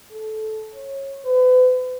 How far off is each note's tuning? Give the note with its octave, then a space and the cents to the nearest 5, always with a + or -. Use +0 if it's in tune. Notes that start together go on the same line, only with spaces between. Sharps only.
A4 -15
C#5 -20
B4 +40